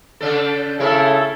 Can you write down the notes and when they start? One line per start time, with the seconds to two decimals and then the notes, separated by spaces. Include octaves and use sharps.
0.21 C#3 D4 A4
0.80 C#3 E4 A4 A#4 E5